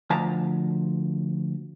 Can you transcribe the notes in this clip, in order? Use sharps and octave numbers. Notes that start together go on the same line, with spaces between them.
D2 F3 A5 A#5